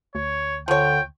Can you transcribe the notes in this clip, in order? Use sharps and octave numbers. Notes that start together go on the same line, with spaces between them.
D2 C#5
D3 F3 C#5 G5